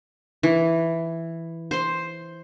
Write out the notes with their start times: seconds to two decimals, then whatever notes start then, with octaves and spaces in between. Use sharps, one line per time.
0.43 E3
1.71 C5 C6